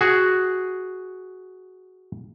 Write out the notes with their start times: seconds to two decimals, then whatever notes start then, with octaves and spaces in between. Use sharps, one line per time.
0.01 F#4 G#4